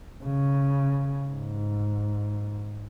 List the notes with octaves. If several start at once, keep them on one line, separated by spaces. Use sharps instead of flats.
C#3
G#2